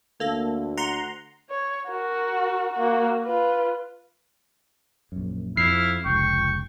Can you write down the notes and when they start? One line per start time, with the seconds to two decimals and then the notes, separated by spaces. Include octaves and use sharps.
0.20 D2 A#3 A4
0.77 F#5 A#5 C6
1.50 C#5
1.89 F#4 A#4
2.73 A#3 F#4
3.24 F4 B4
5.12 A#1 F#2
5.57 F2 E4 F6 C7
6.06 F1 C#2 G5 C#6